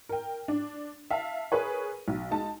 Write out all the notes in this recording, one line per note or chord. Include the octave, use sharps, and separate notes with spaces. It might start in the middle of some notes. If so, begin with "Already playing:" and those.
A#4 G5
D4
E5 F5 A5
G#4 A#4 B4 C#5
B1
G#3 D#4 A5